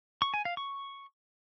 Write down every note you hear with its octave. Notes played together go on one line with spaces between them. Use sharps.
C#6
G#5
F5
C#6